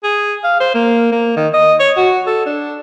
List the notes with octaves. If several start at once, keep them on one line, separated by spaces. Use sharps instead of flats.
G#4
F5
C5
A#3
A#3
D#3
D#5
C#5
F#4
A4
D4